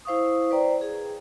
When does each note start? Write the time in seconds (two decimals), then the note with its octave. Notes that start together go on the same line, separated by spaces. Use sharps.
0.05 E4 C5 F5 C#6 D#6
0.51 B4 C5 D5 G5 A#5
0.81 G#4